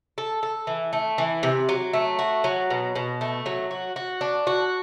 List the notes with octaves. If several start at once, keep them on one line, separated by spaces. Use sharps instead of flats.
A4
A4
E3
A3
E3
C3
F#3
A3
F#4
F#3
B2
B2
A3
F#3
F#4
F#4
D4
F#4